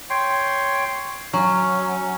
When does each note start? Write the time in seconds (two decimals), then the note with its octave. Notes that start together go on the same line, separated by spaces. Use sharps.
0.10 C#5 G5 C6
1.33 F#3 C#4